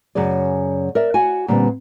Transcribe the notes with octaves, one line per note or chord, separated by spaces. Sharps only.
F#2 C#3 F#3 G#4 D5
A#4 D5 E5
F#4 F#5 G#5
A#2 D3 G3 B3 C4